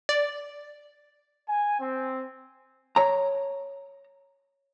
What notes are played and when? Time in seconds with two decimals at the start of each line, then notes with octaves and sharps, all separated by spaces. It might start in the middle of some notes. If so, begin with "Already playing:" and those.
0.09 D5
1.49 G#5
1.80 C4
2.96 C#5 A#5